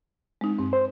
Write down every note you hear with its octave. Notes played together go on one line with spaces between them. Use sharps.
G#3 C4 D#4
G2 C4
C5